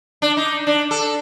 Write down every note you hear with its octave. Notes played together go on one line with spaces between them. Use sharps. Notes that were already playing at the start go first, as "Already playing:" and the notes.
D4
D#4
D4
A4